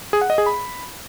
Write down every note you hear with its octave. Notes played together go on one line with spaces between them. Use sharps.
G#4
F#5
D#5
G#4
B5